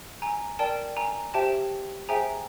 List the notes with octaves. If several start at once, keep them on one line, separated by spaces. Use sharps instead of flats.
G#5 A#5
A#4 D5 G5 A5
G#5 A#5
G4 C5 E5 G5 A5
G#4 C5 E5 G5 G#5 A#5